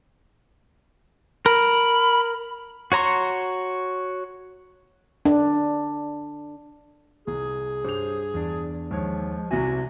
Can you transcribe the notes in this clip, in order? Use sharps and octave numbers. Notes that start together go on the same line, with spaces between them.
A#4 B5
F#4 C#5 A#5 C6 C#6
D4
C2 G#4
G2 G4 C5 C#5 F7
E2 D4
D#2 F3 G#3 C#5
C2 C3 F#4 E5 G#5